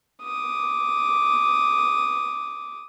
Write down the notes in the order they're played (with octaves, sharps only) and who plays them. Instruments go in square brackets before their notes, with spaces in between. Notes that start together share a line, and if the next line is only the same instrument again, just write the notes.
[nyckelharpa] D6 D#6